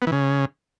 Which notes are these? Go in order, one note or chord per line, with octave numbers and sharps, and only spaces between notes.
B3
E3
C#3